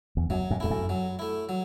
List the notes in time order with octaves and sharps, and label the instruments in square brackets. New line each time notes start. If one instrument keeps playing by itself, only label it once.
[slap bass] E2
[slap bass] F#2 [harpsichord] F#3
[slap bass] F#2
[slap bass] E2 [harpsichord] A3 E4
[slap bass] F#2
[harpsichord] F#3
A3 E4
F#3